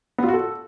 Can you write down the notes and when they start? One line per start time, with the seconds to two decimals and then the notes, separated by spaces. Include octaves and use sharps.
0.18 B3
0.23 F4
0.28 F#4
0.33 A4